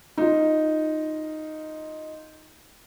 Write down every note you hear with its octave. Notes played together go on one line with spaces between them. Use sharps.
D#4 F4